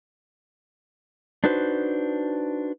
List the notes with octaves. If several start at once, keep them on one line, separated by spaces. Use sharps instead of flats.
D4 D#4 F#4 B4 C5